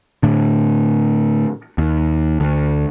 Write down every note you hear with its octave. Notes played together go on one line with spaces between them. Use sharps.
A2 D3
D#2
D2